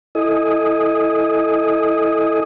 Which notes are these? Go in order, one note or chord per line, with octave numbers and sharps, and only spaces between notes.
E4 A4 D#5 G#5 D#6